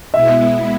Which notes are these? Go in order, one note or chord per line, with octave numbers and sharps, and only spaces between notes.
B2 G#3 B3 E4 E5